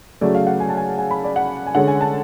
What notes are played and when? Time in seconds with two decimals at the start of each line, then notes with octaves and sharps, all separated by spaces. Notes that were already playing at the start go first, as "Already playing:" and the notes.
0.21 C#3 F#3 A3 D5
0.35 F5
0.47 F#5
0.60 G#5
0.69 A5
0.77 G#5
0.98 G#5
1.11 B5
1.24 D5
1.36 F#5
1.67 G#5
1.75 D3 G#3 C#4 F#5
1.88 G#5
2.01 A5